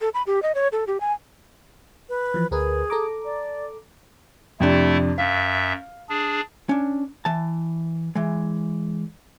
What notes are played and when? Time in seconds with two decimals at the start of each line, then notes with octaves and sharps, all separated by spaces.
0.01 A4
0.14 B5
0.27 G4
0.42 D#5
0.55 C#5
0.72 A4
0.87 G4
1.00 G#5
2.09 B4
2.34 E3 F3
2.51 D2 G#4 A#4 B4
2.90 A4 A#5 D6
3.25 D5
4.60 F2 C3 A3 D4 E4
5.18 F#2 E5 F5
6.09 D4 G#4
6.69 C#4 D4
7.25 E3 A5
8.15 E3 G#3